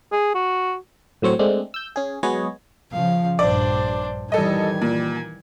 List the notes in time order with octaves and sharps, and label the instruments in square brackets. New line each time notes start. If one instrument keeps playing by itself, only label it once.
[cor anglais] G#4
F#4
[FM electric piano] A2 F#3 C4 C#5
G#3 A3 C4 D4
E6 G6
C#4 G#4
F#3 G#3 B3 G#4 C#5 D#5
[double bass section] C#3 F3 [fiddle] F5
[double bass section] A#1 G2 [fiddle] D4 C5 [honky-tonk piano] D5
[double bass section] D#3 E3 G3 [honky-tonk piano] A4 D#5 [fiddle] G#5
[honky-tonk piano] A#2